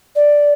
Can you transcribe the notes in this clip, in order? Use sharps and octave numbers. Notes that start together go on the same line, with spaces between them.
D5